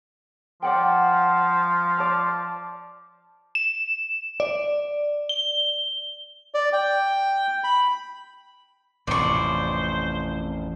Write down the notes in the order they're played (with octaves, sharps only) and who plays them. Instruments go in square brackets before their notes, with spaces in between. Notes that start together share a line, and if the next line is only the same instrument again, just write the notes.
[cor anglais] F3 [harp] D5 F#5 G5
[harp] D5 A5 F6
[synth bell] E7
D5
G7
[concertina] D5
G5
B5
[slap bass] A1 F2 [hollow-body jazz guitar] A2 C3 [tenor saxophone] C5 [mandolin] D5 C#6